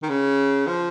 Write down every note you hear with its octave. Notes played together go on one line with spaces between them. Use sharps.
D#3
C#3
F3